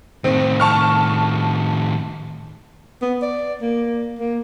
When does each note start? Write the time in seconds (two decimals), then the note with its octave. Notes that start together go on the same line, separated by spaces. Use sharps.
0.24 A2 D#3 C4
0.60 A5 C#6 F6
3.02 B3
3.22 D5
3.61 A#3
4.19 A#3